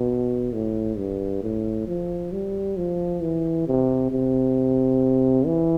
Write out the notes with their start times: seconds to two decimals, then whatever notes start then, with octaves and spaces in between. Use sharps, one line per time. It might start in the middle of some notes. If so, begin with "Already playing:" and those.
Already playing: B2
0.52 A2
0.97 G2
1.42 A2
1.87 F3
2.32 G3
2.77 F3
3.22 E3
3.67 C3
4.11 C3
5.46 E3